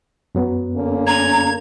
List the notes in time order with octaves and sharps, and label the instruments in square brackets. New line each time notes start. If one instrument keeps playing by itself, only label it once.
[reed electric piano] F#2 F#3 B3
[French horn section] D3 A#3 C#4
[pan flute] A#5 [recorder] G#6